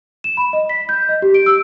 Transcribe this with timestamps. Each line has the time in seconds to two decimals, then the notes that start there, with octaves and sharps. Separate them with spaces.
0.24 E7
0.37 B5
0.53 D#5
0.69 B6
0.89 G6
1.09 D#5
1.22 G4
1.34 D7
1.46 E6